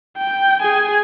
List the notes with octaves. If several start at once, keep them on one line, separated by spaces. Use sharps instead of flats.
G5
G#4 G#5